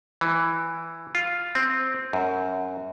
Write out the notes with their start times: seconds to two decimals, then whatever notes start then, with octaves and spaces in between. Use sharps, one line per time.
0.21 E3
1.15 F4
1.55 C4
2.13 F#2